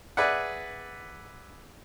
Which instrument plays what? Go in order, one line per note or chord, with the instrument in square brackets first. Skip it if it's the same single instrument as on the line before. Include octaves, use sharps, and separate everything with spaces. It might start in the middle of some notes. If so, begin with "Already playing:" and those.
[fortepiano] G#4 B4 D5 E5 F#5